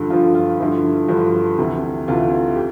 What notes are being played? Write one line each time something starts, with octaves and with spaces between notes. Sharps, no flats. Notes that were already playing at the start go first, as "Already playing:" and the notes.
Already playing: G2 D3 F3
G2 D3 F3 F4
F4
G2 D3 F3 E4
G2 D3 F3
D2 C3 E3
D2 C3 E3 F4
G4